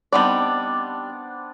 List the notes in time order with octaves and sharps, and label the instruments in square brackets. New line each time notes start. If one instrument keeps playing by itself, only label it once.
[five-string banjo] G3 D#4 D5 [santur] B3 C4 D4